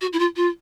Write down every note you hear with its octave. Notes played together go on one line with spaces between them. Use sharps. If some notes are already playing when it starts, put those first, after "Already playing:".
F#4
E4
F4
F4